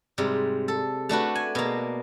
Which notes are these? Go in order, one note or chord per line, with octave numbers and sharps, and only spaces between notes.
G#2 C3 G3
A4
A3 D4 F#4 B4
G#5
B2 A#3